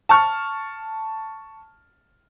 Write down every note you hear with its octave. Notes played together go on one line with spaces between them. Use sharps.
A5 C#6 F6